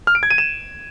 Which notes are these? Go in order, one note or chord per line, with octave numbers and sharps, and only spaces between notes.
F6
D7
G#6
D#7
E7